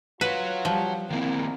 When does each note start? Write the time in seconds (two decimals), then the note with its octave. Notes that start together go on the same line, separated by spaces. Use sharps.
0.21 F4 F#4 B4 C#5
0.65 F3 G3
1.10 C2 D#3 A#3 C4 E4 A#4